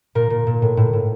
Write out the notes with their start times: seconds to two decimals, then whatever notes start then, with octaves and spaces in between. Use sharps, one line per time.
0.15 A#2 A#4
0.30 A#2
0.47 A#2
0.62 A2
0.77 A2
0.93 A2